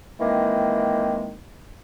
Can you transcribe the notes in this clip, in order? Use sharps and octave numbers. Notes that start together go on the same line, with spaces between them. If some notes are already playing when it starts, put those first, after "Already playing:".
D#3 E3 G#3 A#3 C4